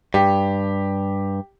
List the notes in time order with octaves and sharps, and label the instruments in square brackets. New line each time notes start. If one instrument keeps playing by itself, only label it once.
[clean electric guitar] G2 [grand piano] G4